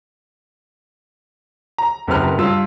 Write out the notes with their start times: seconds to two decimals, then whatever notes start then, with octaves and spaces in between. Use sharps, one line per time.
1.78 A#5
2.07 F#1 F#2 C3 B4 F6
2.38 G2 F4 E6